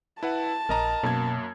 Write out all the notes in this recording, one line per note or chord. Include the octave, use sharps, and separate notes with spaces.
E4 B4 F#5 A5
A#1 A#4 D#5 A#5
F#2 B2 A#3 G#6